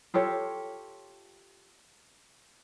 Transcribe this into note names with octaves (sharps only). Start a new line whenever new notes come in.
F4 G4 A4 C#5